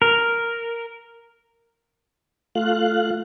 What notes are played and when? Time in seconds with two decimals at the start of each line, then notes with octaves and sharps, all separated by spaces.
0.02 A#4
2.55 A3 F4 F5 F#6